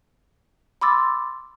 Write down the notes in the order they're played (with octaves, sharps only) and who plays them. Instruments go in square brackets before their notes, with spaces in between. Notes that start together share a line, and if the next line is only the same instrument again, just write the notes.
[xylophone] B5 C6 D6 E6 A6